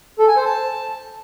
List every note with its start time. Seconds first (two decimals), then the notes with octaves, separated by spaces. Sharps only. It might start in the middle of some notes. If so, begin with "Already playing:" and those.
0.19 A4
0.28 G#5
0.37 C5
0.45 A5